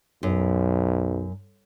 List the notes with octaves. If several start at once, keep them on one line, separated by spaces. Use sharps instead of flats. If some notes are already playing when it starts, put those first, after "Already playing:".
B1 F#2